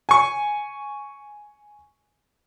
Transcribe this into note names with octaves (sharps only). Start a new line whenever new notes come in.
G#5 C#6